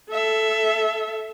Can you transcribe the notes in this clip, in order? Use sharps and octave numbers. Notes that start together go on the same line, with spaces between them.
A4 E5